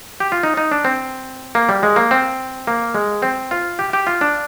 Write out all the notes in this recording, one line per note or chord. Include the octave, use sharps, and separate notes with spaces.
G4
F4
D#4
D#4
D4
C4
A#3
G3
G#3
A#3
C4
A#3
G#3
C4
F4
G4
G4
F4
D4